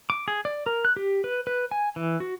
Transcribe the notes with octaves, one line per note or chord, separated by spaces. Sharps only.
D6
G#4
D5
A#4
F#6
G4
B4
B4
G#5
E3
F#4